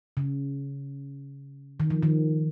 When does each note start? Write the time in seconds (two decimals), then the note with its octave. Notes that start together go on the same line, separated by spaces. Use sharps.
0.17 C#3
1.80 D#3
1.90 F3
2.03 D#3